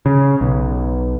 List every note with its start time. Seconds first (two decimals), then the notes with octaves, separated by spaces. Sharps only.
0.06 C#3
0.41 B1